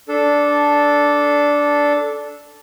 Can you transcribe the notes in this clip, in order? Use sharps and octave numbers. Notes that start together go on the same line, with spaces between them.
D4 A4